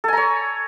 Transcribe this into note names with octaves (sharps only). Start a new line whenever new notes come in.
A4 C#5 G#5 A#5